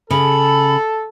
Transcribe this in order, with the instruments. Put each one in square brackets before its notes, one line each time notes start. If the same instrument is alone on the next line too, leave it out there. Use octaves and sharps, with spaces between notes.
[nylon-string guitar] C#3 [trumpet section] A4 [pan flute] B5